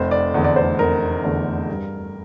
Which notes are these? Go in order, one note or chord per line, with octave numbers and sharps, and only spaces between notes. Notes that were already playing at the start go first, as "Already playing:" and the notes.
Already playing: F1 C5
D5
E2 D3 A3
D5
C5
F1 A#4
E2 D3 A3
G2